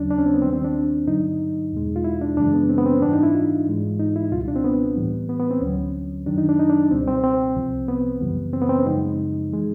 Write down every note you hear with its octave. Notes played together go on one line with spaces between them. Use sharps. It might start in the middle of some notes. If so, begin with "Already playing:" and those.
Already playing: D#2 C#3 F#3 C#4 D4
D4
C#4
C4
B3
D#2 D#3 G3 C4
C4
D4
G2 D3 F#3 D#4
E2 B2 G#3
F4
E4
D4
F#2 C#3 E3 G#3 D4
B3
C4
B3
C4
C#4
G#2 E3 G3 D4
D#4
E4
F4
G#2 E3 G#3
D#4
E4
C#2 B2 G3 F4
D4
C4
B3
A2 E3 G3
B3
B3
C4
D2 D3 F#3 C#4
F#2 D#3 F#3 D4
D#4
D4
D#4
D4
C#2 B2 G3 C4
C4
C4
C2 C3 F3
B3
F#2 C#3 E3 G3
C4
B3
C4
C#4
F#2 C#3 F3 G#3 D#4
E3 G#3